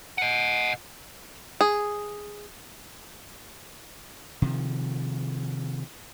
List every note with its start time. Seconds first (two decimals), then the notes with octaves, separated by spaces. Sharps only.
0.18 D#5 F#5
1.61 G#4
4.42 C3 D#3 F3